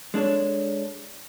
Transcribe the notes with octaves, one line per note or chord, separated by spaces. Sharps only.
G#3 D4 A4 C#5